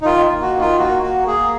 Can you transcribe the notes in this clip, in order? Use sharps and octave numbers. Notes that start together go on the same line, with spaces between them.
D#4
D#3 F4
A#3
F#4
D#3
F4
A#3 F#4
A#3 F#4
A#3 G#4